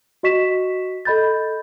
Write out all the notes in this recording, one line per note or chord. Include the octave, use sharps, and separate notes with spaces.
F#4 D#5 C#6 B6 E7
A4 D#5 B5 G6 A6